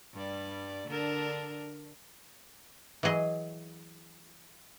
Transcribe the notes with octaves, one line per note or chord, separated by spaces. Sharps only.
G2 G3 D5
D3 D4 A#4
E3 F#3 G#4 D#5